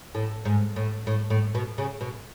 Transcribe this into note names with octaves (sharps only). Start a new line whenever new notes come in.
A2
G#2
A2
A2
A2
B2
C#3
B2